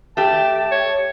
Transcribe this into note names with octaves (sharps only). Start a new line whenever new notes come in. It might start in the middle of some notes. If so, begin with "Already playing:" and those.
A3 G4 A5
C#5